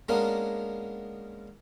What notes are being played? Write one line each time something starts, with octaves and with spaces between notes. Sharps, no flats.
G#3 A#3 B3 C#4 D4 A#4